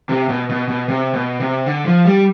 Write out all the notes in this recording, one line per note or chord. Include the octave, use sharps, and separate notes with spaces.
C3
B2
B2
B2
C3
B2
C3
D3
F3
G3